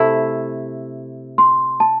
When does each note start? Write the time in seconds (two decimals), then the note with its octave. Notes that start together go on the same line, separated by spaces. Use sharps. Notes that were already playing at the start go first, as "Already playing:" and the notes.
Already playing: C3 A3 E4
1.38 C6
1.80 A5